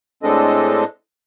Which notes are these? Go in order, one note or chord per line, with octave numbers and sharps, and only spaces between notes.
A2 G#3 C4 D4 A4 D#5